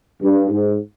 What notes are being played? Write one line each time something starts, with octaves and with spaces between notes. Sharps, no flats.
G2
G#2